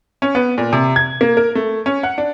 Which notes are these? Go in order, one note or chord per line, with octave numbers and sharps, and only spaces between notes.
C#4
B3
A#2
C3
G#6
A#3
A#4
A3
C#4
F#5
D4